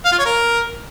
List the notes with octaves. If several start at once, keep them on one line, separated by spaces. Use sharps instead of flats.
F5
F4
C#5
A#4